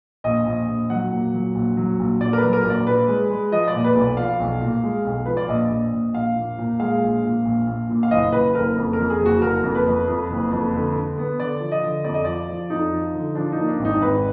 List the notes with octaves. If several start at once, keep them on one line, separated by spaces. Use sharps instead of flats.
A#1 D#5
A#1
A#1
F#3 F#5
A#2
F#3
A#1
F#3
A#1
A#2 D5
A#4
B4
F#3
A#4
A#1
D5
A#2 B4
G#3
G#3
F3 D#5
D5
A#2
B4
B1
D5
F3 F5
B1
A#2
G#3
B1
F3 B4
D5
A#1 D#5
A#1
A#1
A#1 F5
A#2
A#2
G#3 F5
A#1
A#2
A#1
A#1
A#2
F5
F#1 D#5
F#1 B4
F#1 A#4
F2
A#4
F2
G#4
F#1
F#4
F#1 A#4
F2
B4
F2
F2
F#1
F2
D3
D3
B3
D3 D5
F3
D#5
D3
F2 D5
D#5
F3 D5
F3
F2 D#4
F3
D3
F3 D4
D#4
A#3
D4
G#1
D#4
G#1 B4